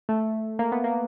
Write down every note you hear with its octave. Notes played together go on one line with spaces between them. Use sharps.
A3
A#3
B3
A#3